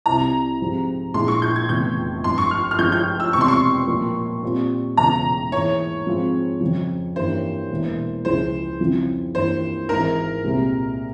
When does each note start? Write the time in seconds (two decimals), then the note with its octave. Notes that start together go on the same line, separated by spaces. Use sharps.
0.06 C2 C3 G3 C4 E4 A#5
0.60 G#2 F3 C4 G4
1.14 A#1 A#2 G#3 E4 G#4 C6
1.28 C#6
1.42 G6
1.56 G#6
1.69 F1 E2 C#3 G6
2.24 G#1 G2 F3 C6
2.38 C#6
2.51 F6
2.71 F6
2.79 G2 F3 G#3 C#4 G6
2.92 G6
3.20 E6
3.33 E1 E2 C3 G3 C4 C#6
3.41 C6
3.48 C#6
3.88 A#2 F3 A#3
4.43 A#2 G3 C4 F4
4.97 E1 E2 C#3 A#5
5.52 G#2 E3 A#3 C#4 C#5
6.07 G#2 F3 G#3 C4 F4
6.61 F2 C#3 F3
7.16 G2 E3 A#3 C#4 C5
7.70 E1 E2 E3 A#3
8.25 C#2 C#3 F3 G#3 E4 C5
8.80 F2 C#3 F3 C4 E4
9.34 G2 E3 A#3 C#4 E4 C5
9.89 G#1 G#2 E3 A#4
10.44 C2 A#2 G#3 C4 G4